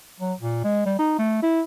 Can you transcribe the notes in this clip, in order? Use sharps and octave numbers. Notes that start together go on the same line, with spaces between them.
F#3
A#2
G#3
G3
D#4
A3
E4